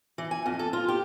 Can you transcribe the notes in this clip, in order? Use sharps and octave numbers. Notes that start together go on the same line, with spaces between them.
E3
G#5
F2
A4
F4
G4